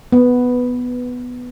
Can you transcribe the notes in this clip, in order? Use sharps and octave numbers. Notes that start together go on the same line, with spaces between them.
B3